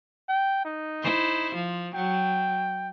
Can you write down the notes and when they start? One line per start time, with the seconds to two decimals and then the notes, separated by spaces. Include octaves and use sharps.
0.29 G5
0.65 D#4
1.03 E4 C5
1.55 F3
1.95 F#3 G5